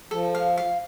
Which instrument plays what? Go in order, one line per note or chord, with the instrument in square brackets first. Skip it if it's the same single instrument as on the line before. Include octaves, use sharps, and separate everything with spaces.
[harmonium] F3 [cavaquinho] A4
[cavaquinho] F5
F5